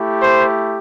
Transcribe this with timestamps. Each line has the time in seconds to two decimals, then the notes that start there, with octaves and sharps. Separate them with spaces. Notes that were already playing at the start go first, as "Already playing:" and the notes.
Already playing: A3 E4 G4
0.19 C5